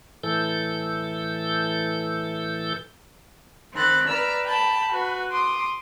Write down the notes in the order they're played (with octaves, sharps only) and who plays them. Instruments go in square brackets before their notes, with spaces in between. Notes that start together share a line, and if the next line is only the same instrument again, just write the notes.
[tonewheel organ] A2 E3 A4 G6
[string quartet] D#3 C4 B5 F#6 A6
B4 D5 A#5 E6 F6
G5 A5 B5
F#4 B4
C6 D6 D#6